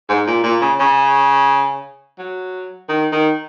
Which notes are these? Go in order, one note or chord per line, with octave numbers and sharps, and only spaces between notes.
G#2
A#2
A#2
C#3
C#3
F#3
D#3
D#3